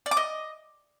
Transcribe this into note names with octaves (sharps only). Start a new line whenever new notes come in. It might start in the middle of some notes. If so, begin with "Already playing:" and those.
D5
D6
D#5